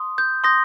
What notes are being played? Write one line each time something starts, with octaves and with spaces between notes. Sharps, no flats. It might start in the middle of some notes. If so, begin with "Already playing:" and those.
Already playing: C6 D#6
G6
C6 D#6 G6 A#6